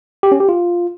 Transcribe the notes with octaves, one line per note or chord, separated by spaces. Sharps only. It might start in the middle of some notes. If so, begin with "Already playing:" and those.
G4
C#4
G4
F4